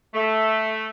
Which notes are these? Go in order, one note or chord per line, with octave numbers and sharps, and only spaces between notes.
A3